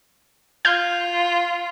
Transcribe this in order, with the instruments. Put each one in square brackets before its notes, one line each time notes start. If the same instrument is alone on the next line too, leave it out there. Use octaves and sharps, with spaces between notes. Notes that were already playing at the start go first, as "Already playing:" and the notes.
[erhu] F4 [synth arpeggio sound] F6 G6 G#6